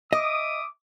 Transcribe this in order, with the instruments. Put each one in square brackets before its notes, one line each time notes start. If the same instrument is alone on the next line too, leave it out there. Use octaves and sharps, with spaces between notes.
[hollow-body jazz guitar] D#5 [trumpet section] E5 D6 D#6